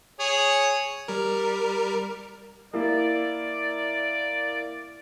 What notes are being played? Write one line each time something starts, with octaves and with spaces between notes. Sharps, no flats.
G#4 C#5
G3 A#4
A#3 E4 D5